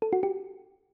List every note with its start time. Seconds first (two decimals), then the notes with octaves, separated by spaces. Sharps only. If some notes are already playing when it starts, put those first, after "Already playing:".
0.02 A4
0.13 F#4
0.23 G4